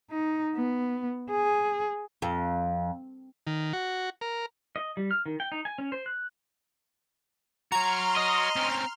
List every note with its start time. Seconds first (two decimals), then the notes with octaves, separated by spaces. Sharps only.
0.11 D#4
0.56 B3
1.31 G#4
2.22 F2
3.47 D#3
3.73 F#4
4.21 A#4
4.76 D#5
4.97 G3
5.11 F6
5.26 D#3
5.40 G5
5.52 D#4
5.65 G#5
5.78 C#4
5.92 C5
6.06 F#6
7.72 F#4 C#5 A#5 C6 F6
8.17 D#5
8.56 C4 C#4